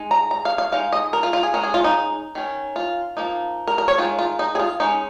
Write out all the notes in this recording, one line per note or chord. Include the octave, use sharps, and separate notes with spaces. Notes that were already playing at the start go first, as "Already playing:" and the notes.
Already playing: G#3 D#4
A#5
A#5
F5
F5
G#3 D#4 F5
D#5
A#4
F4
F4
G#4
G#3 C#4 A#4
G#4
F4
D#4
D#3 C#4
F4
F3 A#3 D#4
A#4
A#4
C#5
D#3 G#3 D#4 F4
F4
D#4
G#4
F4
G#3 C#4 D#4